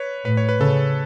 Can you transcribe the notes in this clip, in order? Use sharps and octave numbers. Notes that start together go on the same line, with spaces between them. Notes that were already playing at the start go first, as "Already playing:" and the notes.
Already playing: B4 C#5
A2 B4
C#5
B4
C#3 A4